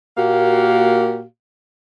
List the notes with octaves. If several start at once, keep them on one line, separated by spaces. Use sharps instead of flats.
A#2 A#3 F#4 G4 F5